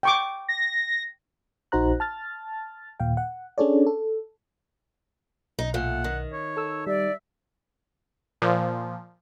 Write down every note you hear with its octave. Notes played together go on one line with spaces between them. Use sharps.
G5 C#6 D6
A#6
A#1 D#4 F#4 C5 A#5 F#6
A5 F6 A6
D#2 A#2 F5 G5
F#5
C#4 D4 G#4 A4 C#5 D5
A4
B1 D#4
A#2 A3 F#5
D#3
C#5
A4 E6
G3 D5 E5
A#2 F3